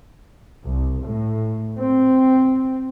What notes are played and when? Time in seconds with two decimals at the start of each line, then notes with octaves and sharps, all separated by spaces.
0.65 C2
1.03 A2
1.79 C4